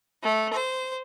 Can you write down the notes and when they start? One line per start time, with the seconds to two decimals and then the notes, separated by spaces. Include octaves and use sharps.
0.22 A3
0.52 C5